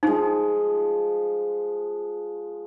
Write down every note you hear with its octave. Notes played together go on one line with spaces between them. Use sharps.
F3 G#3 D#4